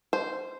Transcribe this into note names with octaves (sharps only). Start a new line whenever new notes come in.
C5